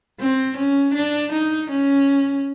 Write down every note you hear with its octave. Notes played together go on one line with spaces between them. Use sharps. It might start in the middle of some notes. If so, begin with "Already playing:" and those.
C4
C#4
D4
D#4
C#4